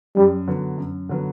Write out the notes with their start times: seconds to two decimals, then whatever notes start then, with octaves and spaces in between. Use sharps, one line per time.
0.16 F#2 G3
0.47 D3 F#3 B3
0.78 F#2
1.09 D3 F#3 B3